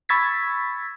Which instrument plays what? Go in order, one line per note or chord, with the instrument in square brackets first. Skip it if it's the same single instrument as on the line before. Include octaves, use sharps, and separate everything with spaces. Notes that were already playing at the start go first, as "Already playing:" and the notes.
[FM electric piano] B5 C#6 E6 G#6 A6 B6